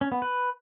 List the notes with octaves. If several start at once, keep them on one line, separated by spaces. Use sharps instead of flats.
C#4
B3
B4